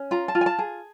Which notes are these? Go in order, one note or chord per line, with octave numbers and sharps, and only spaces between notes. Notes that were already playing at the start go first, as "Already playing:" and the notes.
Already playing: C#4
F4 A#5
A5
F4
G#5
A5
G#4